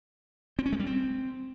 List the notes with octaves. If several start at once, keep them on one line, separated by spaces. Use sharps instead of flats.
C4
C#4
G#3
G3
C4